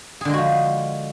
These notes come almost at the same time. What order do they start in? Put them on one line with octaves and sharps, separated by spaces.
G#4 D3 G#3 F#4 F3